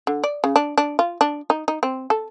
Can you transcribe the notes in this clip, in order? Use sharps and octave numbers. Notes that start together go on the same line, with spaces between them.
D3
D5
C#3
D4
D4
F4
D4
D#4
D#4
C4
A4